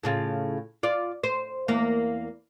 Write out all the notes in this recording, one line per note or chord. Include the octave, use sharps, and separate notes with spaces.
A2 C#3 F4
F4 D5
C5
E2 A#3